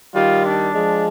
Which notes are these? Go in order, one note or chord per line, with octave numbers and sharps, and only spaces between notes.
D#3 G3 F4
D4
F3 G#3